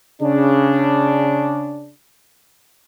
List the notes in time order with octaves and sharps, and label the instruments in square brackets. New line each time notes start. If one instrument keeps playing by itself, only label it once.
[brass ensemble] C#3 D4